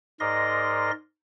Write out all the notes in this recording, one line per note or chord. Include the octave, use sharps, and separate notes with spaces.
G#2 A#4 D5 D#5 C6 A#6